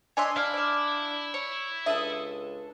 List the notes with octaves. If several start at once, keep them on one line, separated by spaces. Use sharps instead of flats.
D4 C#5 D#5 E5 G#5 C6
D4 E4 F5
D5 F5
C#5
C#2 D4 A4 E5 D#6